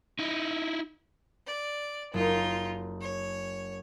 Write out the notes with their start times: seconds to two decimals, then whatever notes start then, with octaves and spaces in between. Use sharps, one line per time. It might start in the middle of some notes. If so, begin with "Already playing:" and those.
0.19 D#4 E4
1.47 D5
2.14 F#1 D#4 F4
3.01 C#5